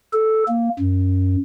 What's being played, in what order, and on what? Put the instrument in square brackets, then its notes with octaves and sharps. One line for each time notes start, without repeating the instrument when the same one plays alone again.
[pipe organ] A4
A#3
F#2